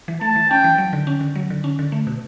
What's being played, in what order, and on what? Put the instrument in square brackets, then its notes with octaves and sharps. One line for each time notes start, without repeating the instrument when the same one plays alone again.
[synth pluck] E3
[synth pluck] A3 [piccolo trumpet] A5
[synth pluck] E3
[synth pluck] C#4 [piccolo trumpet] G5
[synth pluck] E3
F#3
D3
C#4
D3
F#3
D3
C#4
D3
A3
B2